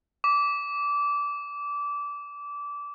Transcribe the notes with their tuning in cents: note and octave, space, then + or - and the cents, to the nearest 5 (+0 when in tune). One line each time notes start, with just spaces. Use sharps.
D6 -20